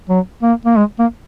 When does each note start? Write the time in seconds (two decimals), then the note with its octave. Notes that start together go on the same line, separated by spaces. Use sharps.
0.09 F#3
0.42 A#3
0.65 A#3
0.76 G#3
0.99 A#3